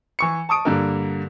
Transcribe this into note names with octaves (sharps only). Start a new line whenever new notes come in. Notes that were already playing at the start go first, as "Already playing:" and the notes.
E3 C#6 C#7
A5 C#6 D#6 D7
G2 D3 A#3